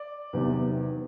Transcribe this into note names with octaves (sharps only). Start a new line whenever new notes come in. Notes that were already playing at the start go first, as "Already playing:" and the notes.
Already playing: D5
E2 C3 D#3 F#3 B3